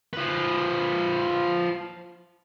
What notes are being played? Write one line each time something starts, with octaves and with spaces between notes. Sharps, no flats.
F3 B4